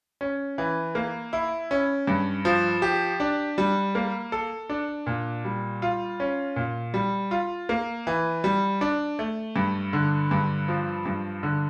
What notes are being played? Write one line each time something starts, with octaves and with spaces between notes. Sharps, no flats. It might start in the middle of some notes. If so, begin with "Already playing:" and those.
C#4
E3
A#3
E4
C#4
G2
F3
G4
D4
G3
A#3
A4
D4
A#2
G3
F4
C#4
A#2
G3
F4
A#3
E3
G3
D4
A3
G2
D3
G2
F3
G2
D3